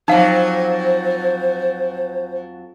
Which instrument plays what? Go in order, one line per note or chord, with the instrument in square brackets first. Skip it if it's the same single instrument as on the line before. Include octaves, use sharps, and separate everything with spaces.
[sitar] F2 F#3 [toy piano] D#4 F5 [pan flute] C5